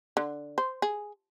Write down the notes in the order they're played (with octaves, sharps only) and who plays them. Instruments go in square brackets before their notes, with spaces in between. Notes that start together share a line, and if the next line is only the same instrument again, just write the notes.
[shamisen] D3
C5
G#4